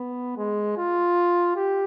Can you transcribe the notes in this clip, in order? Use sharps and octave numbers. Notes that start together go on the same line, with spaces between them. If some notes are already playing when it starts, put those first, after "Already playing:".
Already playing: B3
G#3
F4
G4